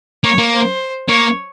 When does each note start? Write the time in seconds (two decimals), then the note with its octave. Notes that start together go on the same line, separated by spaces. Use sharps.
0.24 A#3 C#5
0.38 A#3
0.52 C5
1.08 A#3 C#5